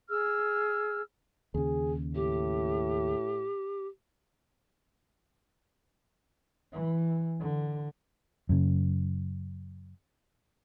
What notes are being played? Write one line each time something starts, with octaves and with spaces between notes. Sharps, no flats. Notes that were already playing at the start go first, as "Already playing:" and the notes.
G#4 E6 F6
D#2 C#3 G#4
A2 G4
E3
D3
F#2 C#3